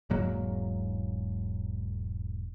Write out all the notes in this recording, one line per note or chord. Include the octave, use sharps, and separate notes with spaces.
E1 G#2 F#3 A#3